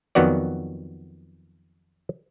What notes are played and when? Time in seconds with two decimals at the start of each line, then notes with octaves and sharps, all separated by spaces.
0.15 F2 D#3 F#3 B3 F#4 D5